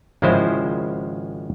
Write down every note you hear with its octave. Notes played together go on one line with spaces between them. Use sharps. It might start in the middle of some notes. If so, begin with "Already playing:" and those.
G#1 C#3 F3 G#3 E4 C5